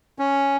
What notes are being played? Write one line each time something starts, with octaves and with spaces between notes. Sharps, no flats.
C#4